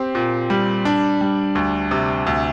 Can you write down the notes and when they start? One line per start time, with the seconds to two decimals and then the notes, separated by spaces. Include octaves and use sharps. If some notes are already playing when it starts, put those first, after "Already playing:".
Already playing: C4 G4
0.15 A#2
0.50 G3
0.85 D4
1.21 G3
1.55 D2
1.91 C3
2.27 D2